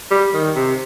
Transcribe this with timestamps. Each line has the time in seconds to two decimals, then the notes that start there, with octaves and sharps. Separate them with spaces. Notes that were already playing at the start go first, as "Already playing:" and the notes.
0.11 G3
0.34 D#3
0.56 C3